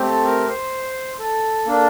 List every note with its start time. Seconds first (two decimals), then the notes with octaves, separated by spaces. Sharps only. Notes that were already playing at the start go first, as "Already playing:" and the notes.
Already playing: A3 C4 G4
0.09 A4
0.25 A#4
0.48 C5
1.19 A4
1.66 A#3 D4 A4